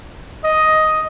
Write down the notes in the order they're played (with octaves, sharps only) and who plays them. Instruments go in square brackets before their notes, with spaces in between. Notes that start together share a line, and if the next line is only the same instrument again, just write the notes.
[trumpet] D#5